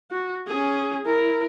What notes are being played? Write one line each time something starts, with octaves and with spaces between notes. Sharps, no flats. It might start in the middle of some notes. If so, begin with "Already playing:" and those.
F#4
C#4 G#4
E4 A#4